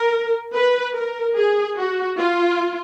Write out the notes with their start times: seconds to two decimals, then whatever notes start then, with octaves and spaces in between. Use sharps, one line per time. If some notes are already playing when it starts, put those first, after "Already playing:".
Already playing: A#4
0.54 B4
0.95 A#4
1.36 G#4
1.77 F#4
2.19 F4